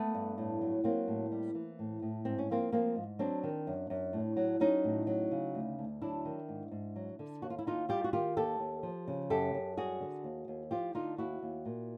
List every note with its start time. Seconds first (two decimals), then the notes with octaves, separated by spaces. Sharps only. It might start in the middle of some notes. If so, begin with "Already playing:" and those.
Already playing: A3 B3
0.14 G2
0.38 A2
0.61 F#3
0.84 F#3 A#3 C4
1.08 A2
1.32 G3
1.55 E3
1.79 A2
2.02 A2
2.25 G#2 C4
2.38 C#4
2.49 F3 A#3 C4
2.72 F3 A#3 C4
2.96 G#2
3.19 F#3 C4 D4
3.43 D#3
3.67 F#2
3.90 F#2
4.13 A2
4.37 F#3
4.60 F#3 C#4 D#4
4.84 A2
5.07 F#3
5.31 C#3
5.55 D2
5.79 D2
6.02 F#3 D4 E4
6.25 D#3
6.48 G#2
6.71 G#2
6.96 F#3
7.19 D3
7.42 D#2 F#4
7.50 F4
7.59 E4
7.65 D#2 D#4 F4
7.89 G3 F4 G4
8.04 F#4
8.13 D#3 F4 G4
8.36 D#2 G4 A4
8.60 D#2
8.83 F3
9.07 C#3
9.30 F#2 G4 A4
9.54 F#2
9.77 G3 F#4 G#4
10.00 D3
10.24 D#2
10.48 D#2
10.71 F3 F4 G4
10.95 D3 D#4 F4
11.18 D#2 E4 F#4
11.42 D#2
11.66 A#2